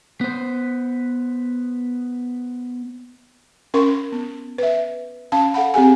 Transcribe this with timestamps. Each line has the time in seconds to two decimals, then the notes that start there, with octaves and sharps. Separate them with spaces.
0.21 B3 C5
3.74 C#4 A#4 C6 C#6
4.12 B3
4.58 B4 E5
5.32 C#4 F5 A5
5.54 A4 F5 F#5 B5
5.74 C4 G4 G#4 G#5